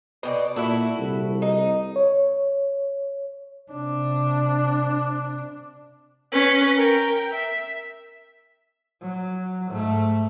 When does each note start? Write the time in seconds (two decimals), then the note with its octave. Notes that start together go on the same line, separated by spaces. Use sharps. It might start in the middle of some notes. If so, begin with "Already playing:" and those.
0.23 B2 G4 D5
0.56 A#2 E4 F#4 A4
0.98 C2
1.42 D#4
1.96 C#5
3.71 C3 D4
6.32 C#4 B4
6.76 A#4 G5
7.32 E5
9.02 F#3
9.69 G#2 A3